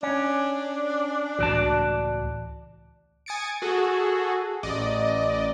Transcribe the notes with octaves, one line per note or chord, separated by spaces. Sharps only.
C#4 D4
C#2 A2 E3 F#4 D5 A5
G#5 D#6 A6 C#7 D7
F#4 G#4 A4
A1 D5 D#5